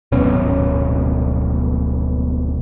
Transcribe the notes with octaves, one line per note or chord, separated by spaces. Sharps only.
D1 G#1 B2 C#4